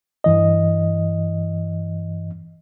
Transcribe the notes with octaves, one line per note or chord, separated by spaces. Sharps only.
G2 E3 D#5